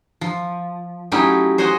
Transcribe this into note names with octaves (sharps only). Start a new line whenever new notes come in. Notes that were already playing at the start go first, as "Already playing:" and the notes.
F3
F#3 A3 C#4 D#4 E4 G4
C5 C#5 D#5 F#5 G#5